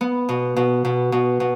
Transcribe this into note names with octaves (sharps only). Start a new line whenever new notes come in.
B3
B2
B2
B2
B2
B2